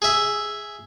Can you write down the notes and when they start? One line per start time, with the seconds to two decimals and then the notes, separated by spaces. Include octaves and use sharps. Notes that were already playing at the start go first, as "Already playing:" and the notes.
0.02 G#4 E5